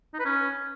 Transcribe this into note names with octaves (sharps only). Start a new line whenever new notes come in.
D#4
B4
C#4